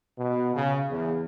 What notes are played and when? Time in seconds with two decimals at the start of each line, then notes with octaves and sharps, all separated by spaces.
0.19 B2
0.56 C#3
0.90 E2